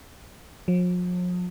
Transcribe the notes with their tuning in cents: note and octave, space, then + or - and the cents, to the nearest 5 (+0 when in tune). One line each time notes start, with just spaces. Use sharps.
F3 +45